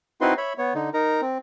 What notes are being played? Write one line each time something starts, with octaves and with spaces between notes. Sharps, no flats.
C4 D#4 E4 F#4 B4 C6
C#5 E5 B5
B3 C#5
D3 D#4
D#4 A#4 A#5
C4